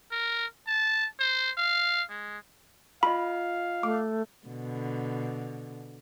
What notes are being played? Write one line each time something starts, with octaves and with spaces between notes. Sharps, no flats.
A#4
A5
C5
F5
G#3
F4 D#5 F5 B5
A3 D6
B2 D3